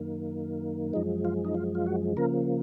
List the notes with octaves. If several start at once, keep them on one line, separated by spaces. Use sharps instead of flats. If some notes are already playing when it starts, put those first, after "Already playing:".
Already playing: F#2 D#3 A#3
F#2 F3 G#3 D#4
F4
D#4
F4
F4
F#4
C#3 F3 A#3 A#4